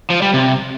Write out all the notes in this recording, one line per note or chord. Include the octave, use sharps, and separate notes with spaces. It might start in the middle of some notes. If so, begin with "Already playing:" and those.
F3
G3
C3